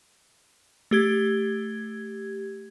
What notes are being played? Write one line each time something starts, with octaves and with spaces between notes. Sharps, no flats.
A3 G4 G#6